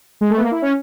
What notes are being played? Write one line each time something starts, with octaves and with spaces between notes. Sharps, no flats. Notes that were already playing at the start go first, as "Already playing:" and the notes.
G#3
A3
B3
A#3
E4
C#4